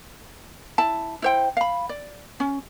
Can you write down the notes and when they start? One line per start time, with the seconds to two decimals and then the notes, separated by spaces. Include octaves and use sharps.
0.78 E4 A5
1.22 E4 C5 G5
1.57 F5 B5
1.89 D5
2.40 C#4